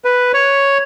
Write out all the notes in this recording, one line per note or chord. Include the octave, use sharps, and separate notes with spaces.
B4
C#5